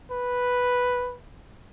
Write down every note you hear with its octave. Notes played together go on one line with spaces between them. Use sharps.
B4